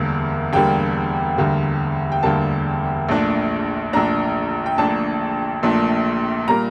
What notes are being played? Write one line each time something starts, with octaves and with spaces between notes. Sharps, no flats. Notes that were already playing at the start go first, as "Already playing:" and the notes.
Already playing: E1 D2 D3 G3 A#3
E1 D2 D3 G3 A#3 G5
E1 D2 D3 G3 A#3
G5
E1 D2 D3 G3 A#3 A5
A#1 A#2 A3 D4
A#1 A#2 A3 D4 A#5
G5
A#1 A#2 A3 D4 A5
A#1 A#2 A3 D4
A#2 G3 A#3 A#5